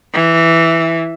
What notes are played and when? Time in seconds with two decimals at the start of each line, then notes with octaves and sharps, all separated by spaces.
0.14 E3